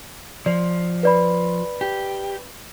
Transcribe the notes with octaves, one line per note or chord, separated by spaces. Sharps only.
F3 D5
B4 D5 B5
G4